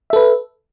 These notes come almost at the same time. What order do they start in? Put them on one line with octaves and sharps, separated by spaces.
E5 A4 B4